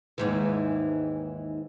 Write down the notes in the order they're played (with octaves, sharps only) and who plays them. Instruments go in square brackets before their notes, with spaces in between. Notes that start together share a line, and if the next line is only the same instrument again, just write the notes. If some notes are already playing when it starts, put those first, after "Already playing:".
[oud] D#2 G#2 E3